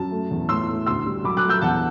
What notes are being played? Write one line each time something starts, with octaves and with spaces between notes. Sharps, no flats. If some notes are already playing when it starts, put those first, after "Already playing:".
Already playing: F#2 A5
A3
E2
A2 C6 E6
A3
D2 C6 E6
G3
F#3 B5 D6
D6 F#6
A3
E6 G6
E2 F#5 A5